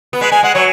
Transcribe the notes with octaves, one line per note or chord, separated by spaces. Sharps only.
B3
G#3 B4
G#3 G#5
G#3 F#5
F#3 C#5